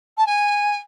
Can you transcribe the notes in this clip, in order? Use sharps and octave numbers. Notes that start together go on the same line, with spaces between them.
A5
G#5